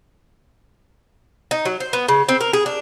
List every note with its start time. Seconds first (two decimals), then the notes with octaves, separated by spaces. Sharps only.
1.51 D#4
1.65 F#3
1.80 C5
1.93 B3
2.08 C#3
2.29 C4
2.41 A#4
2.53 G#4
2.66 D4